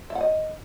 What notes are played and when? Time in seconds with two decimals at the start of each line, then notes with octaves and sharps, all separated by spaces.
0.10 E5
0.15 F#5
0.21 D#5